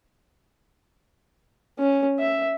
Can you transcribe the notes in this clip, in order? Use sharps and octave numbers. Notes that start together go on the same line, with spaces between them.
C#4
E5